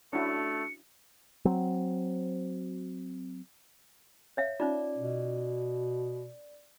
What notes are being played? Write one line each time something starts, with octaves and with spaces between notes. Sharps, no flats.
A3 C#4 D4 E4 F#4 C#7
F#3 C4
C#5 E5 F5
C#4 D#4 F4 D5
B2